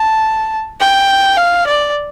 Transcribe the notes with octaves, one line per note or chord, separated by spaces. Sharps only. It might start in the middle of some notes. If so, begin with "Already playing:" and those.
Already playing: A5
G5
F5
D5